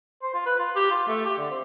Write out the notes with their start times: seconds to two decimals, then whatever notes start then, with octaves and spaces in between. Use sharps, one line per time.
0.22 C5
0.34 F4
0.46 B4
0.59 F4
0.75 G4
0.90 F4
1.08 A3
1.25 G4
1.38 D3
1.50 C4